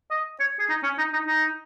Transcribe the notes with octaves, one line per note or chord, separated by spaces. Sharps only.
D#5
C#5
G#4
D#4
C#4
D#4
D#4
D#4